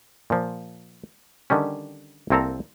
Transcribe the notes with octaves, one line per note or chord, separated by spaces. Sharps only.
A#2 F3
D3 D#3 G3 C#4
C2 A#3 C4 A4 A5 A#5